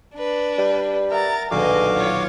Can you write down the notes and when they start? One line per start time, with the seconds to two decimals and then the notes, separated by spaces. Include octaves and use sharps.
0.15 D4 B4
0.58 G3
1.11 A#4 E5 F#5 A#5 A6
1.51 D#1 B1 D3 F#4 G#4 D#5 F5 D6
1.96 F4 C#5